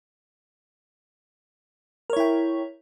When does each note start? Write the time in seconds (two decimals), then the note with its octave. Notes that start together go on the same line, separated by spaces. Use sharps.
2.10 A#4
2.13 C#5
2.17 E4
2.20 G5